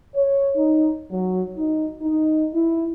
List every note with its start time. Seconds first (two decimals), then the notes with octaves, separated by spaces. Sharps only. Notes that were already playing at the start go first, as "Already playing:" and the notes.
0.15 C#5
0.55 D#4
1.11 F#3
1.57 D#4
2.01 D#4
2.54 E4